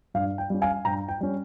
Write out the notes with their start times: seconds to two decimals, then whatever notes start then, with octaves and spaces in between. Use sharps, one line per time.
0.14 G2 F5
0.38 G5
0.50 G3 C#4
0.62 F5 G#5
0.85 G2 G5 A#5
1.09 G5
1.21 G3 C#4